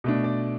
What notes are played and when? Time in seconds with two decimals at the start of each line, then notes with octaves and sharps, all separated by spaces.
0.04 B2 A3 D4
0.24 D5